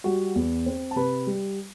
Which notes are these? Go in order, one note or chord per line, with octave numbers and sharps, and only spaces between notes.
G3 F#4 F#5
E2
C4
A5
C3 B4 B5
G3